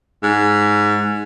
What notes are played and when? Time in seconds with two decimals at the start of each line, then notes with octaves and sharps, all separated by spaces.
0.23 G#2